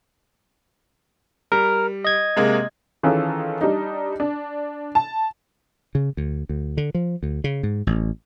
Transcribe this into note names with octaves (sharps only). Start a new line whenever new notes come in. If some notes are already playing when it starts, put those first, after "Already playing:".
G3 A#4
D#5 G#6
C3 G#3 A#3
D#3 E3 C#4 F4 G#4 A4
G3 D4 D#4
D4
A5
C#3
D2
D2
D3
F3
D2
C#3
G#2
A1